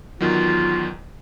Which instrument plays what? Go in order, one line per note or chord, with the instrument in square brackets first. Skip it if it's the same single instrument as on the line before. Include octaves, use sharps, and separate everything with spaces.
[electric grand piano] E2 D#3 F#3 [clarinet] F4